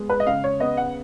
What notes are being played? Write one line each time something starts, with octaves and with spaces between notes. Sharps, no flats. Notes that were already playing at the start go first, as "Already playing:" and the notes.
Already playing: G#3 B3
B4
D#5
C#3 F5
C#5
B3 D#5
F#5